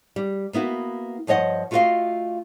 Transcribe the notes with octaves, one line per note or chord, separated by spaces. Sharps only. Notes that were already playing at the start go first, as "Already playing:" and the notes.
G3
A#3 B3 E4 F#4
G2 F3 C#5 D#5 F#5
A3 F4 F#4 A4 D#5 F5